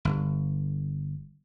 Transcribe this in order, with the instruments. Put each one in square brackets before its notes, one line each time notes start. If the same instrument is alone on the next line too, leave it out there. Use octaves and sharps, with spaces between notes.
[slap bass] G1